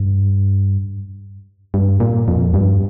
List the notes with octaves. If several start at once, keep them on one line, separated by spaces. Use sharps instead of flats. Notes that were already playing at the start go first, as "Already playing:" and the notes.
Already playing: G2
G2
A#2
F2
G2